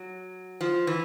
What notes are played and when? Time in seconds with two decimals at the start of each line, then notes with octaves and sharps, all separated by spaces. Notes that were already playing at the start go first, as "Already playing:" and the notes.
Already playing: F#3
0.61 F3
0.87 E3